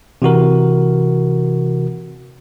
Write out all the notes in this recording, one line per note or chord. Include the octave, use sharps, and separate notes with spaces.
C3 E3 F#4 A#4